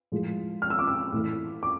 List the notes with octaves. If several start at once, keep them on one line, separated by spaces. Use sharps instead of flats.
A2 F3 G#3
F6
E6
D6
E6
A2 E3 A3
D6